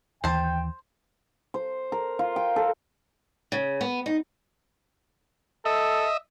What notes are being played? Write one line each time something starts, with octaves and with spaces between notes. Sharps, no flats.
D#2 E3 C5 G5 A5
C5
A#4
F4
G5
A4
C#3
B3
D#4
A4 D#5 E5